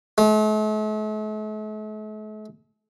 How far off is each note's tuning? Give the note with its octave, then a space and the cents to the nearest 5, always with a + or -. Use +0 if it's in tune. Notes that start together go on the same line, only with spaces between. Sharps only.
A3 -45